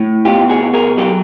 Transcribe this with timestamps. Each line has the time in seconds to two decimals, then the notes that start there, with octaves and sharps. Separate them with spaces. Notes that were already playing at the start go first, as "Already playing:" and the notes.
Already playing: A2
0.25 B2 F4 G4
0.49 F#4 G#4
0.61 B2
0.73 G#4 A#4
0.97 F#3 G4 A4